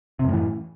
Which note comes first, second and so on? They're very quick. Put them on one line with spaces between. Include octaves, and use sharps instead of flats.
C3 F#2 A2 E3